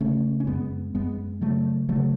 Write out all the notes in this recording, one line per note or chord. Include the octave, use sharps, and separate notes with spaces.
C#3 A3 C#4
C#4
F#2 G#3 B3
F#2 G#3 B3
C#3 F#3 A3
C#3 F#3 A3